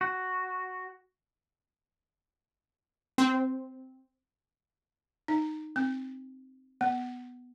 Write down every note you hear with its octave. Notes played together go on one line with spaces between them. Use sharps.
F#4
C4
D#4
C4
B3